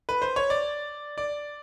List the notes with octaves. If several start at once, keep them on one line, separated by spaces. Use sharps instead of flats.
B4
C5
C#5
D5
D5